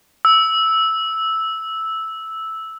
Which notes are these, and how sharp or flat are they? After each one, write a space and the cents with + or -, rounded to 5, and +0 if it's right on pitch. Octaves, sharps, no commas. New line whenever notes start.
E6 -5